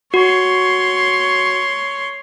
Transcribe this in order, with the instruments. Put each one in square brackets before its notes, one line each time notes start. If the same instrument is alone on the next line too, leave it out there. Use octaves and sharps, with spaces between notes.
[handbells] F#4 [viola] C#5 C6